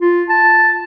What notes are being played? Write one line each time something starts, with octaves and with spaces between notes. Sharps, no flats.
F4
A5